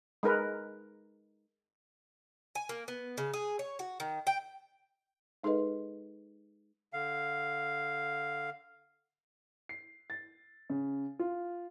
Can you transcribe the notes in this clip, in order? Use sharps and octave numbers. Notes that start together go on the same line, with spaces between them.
G#3 D#4 A#4 B4
G#5
A#3
B3
C#3
G#4
C#5
F#4
D#3
G5
G#3 D#4 G#4 A4 B4 D#5
D3 F5
C7
A6
C#3
F4